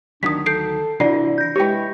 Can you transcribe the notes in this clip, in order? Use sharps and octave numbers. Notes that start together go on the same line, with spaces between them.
D2 D#3 F#3 D4 D#6 B6
A4 G6 C7 D7
C3 E3 D4 E4 D5 D#5 C7
G6 A#6
G#3 E4 G4 B4 C#5 G5